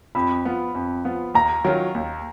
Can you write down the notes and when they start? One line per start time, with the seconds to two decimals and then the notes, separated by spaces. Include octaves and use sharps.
0.15 F2 B5
0.45 F3 B3 F4
0.75 F2
1.05 F3 B3 F4
1.34 D#2 A#5
1.64 D#3 F#3 C#4 F4
1.95 D#2